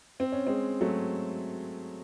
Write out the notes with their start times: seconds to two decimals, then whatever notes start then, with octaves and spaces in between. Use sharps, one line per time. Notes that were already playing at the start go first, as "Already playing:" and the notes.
0.20 C4
0.32 C#4
0.47 G#3 C4
0.81 F#3 A3